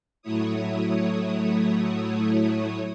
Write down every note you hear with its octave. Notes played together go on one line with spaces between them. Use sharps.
A2 F#3 A3 E4 C#5 D#6